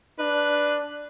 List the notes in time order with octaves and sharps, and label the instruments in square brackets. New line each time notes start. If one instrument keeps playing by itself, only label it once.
[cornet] D4 [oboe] B4